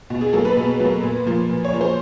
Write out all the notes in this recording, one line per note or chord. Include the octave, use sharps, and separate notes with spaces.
B2
G#4
F#3 A#3 A4
B4
B2
F#3 A#3
A#2
F3 A#3
A#2
C#5
F3 A#3
C5